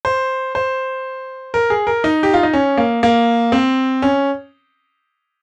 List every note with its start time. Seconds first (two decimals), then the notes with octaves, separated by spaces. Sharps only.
0.05 C5
0.55 C5
1.54 A#4
1.70 G#4
1.87 A#4
2.04 D#4
2.23 G4
2.34 F4
2.43 D#4
2.53 C#4
2.78 A#3
3.03 A#3
3.52 C4
4.02 C#4